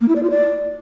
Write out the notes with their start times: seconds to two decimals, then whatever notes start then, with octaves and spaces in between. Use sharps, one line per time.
0.01 A#3
0.08 E4
0.15 D5
0.23 F4
0.30 D5